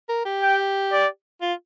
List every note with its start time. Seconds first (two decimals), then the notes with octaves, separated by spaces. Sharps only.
0.09 A#4
0.25 G4
0.43 G5
0.92 D5
1.42 F4